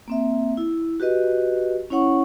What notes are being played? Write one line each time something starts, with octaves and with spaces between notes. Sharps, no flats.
A#3 C4 E5
E4
F#4 G4 B4 D#5
C#4 E4 C#5 F#5 C#6